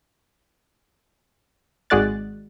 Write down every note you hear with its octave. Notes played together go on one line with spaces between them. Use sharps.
G#1 G#3 F#4 D5 F#6 A6